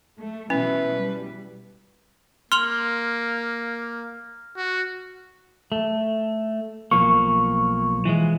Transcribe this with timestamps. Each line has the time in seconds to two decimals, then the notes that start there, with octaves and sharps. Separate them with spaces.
0.20 A3
0.50 B2 E3 C#4 E4 B4
0.93 G3
2.52 A#3 C6 F6 F7 F#7
4.57 F#4
5.72 A3
6.92 B1 F3 A#3 C#6
8.05 E3 F3 G#3